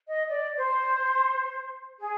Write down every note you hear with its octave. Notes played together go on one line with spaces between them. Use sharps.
D#5
D5
C5
G#4